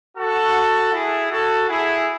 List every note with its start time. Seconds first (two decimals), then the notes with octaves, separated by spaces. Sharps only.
0.17 F#4 A4
0.92 E4 G#4
1.30 F#4 A4
1.68 E4 G#4